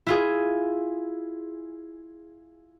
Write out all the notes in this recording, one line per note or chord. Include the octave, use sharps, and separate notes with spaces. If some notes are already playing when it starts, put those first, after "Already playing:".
E4 F4 G#4